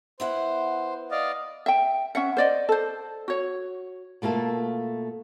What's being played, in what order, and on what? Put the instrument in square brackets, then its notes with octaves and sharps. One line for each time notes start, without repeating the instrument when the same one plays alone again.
[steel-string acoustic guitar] B3 E4 F#5 [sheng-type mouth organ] C5
[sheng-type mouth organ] D5 D#5 F5
[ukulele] E5 G5
C#4 E5 F#5
C5 D5 D#5
A4 C5
F#4 C#5
[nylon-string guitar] B2 A3 A#3 F4 A4